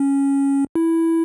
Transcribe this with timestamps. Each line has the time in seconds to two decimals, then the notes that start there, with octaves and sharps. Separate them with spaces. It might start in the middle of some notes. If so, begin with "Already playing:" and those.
Already playing: C#4
0.75 E4